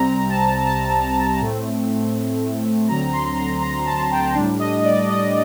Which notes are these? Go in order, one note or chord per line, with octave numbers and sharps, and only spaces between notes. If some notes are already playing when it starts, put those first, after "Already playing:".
Already playing: C2 C3 G3 C4 A#5
A5
A5
A2 A3 C4
D2 D3 F#3 C4 A#5
C6
C6
A#5
A#5
A5
G5
A2 G3 D4
D#5
D5
D#5